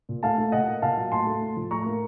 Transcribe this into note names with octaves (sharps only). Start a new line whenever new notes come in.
A#2
A3 F5 A5
A3
A#2 D#5 F#5
A#3
A#2 F5 A5
F#3
A2 A5 C6
A3
A2
F3
A2 A#5 C#6
A#3